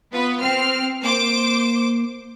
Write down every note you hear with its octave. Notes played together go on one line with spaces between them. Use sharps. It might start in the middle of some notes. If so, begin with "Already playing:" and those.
B3 F4 B4
C4 F6
A#3 C5 D6